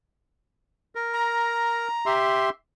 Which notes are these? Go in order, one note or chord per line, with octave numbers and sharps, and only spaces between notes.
A#4
A#5
G4 E5 C6